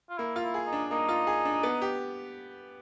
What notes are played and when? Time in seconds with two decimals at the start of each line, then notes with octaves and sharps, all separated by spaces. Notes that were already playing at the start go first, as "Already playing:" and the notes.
0.09 F4
0.18 A#3 E4
0.36 F4
0.43 E4
0.54 G#4
0.66 D#4
0.73 D4
0.91 A#3 D#4
1.09 F4
1.27 G#4
1.45 D4
1.63 B3
1.82 G4